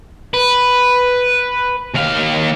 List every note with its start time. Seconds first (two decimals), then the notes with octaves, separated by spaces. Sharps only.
0.34 B4
1.95 D#2 F5